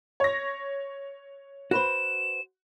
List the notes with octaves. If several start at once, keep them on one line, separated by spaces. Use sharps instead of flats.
C#5 A#6
F#4 B4 C5 E7